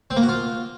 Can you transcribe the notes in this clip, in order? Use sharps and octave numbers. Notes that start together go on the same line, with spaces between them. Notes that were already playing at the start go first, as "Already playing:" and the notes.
C4
A#3
F#4
F4